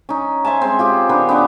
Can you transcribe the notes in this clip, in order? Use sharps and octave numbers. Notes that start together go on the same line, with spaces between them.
C#4 D#4
C5 E5 G#5 A5
G#3 C4
F4 G4 G#4
D#3 B3 D4
B3 C#4 D4 G5